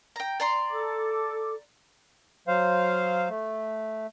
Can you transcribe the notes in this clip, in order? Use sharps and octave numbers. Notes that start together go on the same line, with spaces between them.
G5 A#5
D5 A#5 C6
A4 D6
F#3 C5 F5
A3